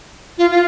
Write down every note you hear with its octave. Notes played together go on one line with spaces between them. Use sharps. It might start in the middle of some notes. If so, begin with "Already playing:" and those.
F4
F4